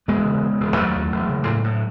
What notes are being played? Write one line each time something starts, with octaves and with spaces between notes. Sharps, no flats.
E1 G#3 B3
C#3
C#3
E1
D#2 F#3 A3
D#2
E1
C#3
A2
A2